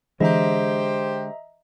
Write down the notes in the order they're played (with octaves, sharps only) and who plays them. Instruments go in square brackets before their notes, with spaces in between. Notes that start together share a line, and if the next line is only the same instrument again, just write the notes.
[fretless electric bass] D3 G#3 [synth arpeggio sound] E3 [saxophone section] G4 C5 [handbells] D#5 E5 A#5